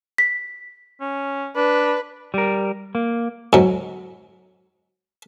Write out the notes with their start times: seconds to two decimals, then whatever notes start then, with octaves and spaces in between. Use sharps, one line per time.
0.18 B6
1.01 C#4
1.56 D4 B4
2.34 G3 A#4
2.95 A#3
3.53 G#2 F#3